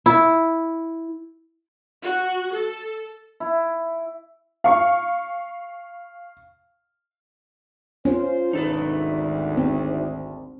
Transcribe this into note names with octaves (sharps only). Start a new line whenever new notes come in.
E4
F#4
A4
E4
F5 C#6
C#4 F4 C5
G#1 D2 D#4 A4 B4
C4